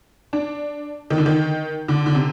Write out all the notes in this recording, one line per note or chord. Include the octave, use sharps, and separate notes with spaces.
D4
D#3
D3
D#3
D3
D3
C3